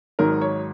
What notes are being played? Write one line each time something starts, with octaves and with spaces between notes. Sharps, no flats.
G#1 G#2 D#3 F#3 A#4
C#5